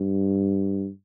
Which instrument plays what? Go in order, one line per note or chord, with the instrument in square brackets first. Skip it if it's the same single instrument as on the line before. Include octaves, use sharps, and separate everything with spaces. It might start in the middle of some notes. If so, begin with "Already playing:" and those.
Already playing: [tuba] G2